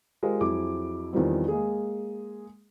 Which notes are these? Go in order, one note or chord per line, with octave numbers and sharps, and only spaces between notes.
G#3 F4 G4 A#4 C5
F2 F#3 E4 G#4 D6
E2 D#3 F3 G3 C4
G#3 A#3 G#4